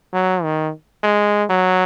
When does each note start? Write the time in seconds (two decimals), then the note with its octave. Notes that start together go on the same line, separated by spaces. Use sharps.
0.13 F#3
0.43 D#3
1.03 G#3
1.50 F#3